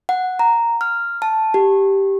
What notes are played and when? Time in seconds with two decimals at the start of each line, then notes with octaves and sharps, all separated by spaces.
0.09 F#5
0.39 A#5
0.81 F6
1.22 A5
1.54 G4